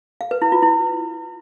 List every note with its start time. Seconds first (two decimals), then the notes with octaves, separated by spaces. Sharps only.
0.21 F5
0.31 B4
0.42 E4
0.52 F4
0.63 E4